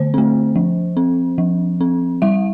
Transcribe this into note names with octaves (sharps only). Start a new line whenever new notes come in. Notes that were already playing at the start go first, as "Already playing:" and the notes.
Already playing: D3 A3 C5
A3 C4
F3
C4
F3
C4
G3 E5